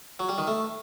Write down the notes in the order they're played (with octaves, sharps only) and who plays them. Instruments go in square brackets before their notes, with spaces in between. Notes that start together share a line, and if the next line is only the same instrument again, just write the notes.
[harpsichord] F#3
G3
D#3
A3